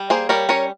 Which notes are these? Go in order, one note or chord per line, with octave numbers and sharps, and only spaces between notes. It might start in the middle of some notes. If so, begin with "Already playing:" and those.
Already playing: G3
A#3 G#4 C5
G3 A#4 C#5
C#4 A#4 C#5